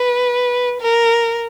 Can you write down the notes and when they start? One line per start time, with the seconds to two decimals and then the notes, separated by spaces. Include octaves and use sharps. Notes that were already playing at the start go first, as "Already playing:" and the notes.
Already playing: B4
0.81 A#4